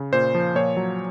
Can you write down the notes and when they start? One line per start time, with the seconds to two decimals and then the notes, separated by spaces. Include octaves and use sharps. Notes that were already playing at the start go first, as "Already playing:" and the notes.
Already playing: C#3
0.13 A#2 C5
0.35 F3
0.55 A#2 C#5
0.77 F#3